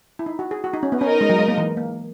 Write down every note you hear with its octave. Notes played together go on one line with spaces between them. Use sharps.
E4
D#4
F#4
G#4
F#4
D#4
C#4
B3
C#4 D#4 A#4 D#5
G#3
F#3
G#3
A#3
E3
A#3